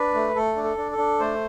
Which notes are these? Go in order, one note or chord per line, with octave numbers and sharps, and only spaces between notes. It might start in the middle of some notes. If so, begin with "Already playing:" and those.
Already playing: D4 B4
A3
A3 A4
D4
A4
D4
A4
D4
A3 C5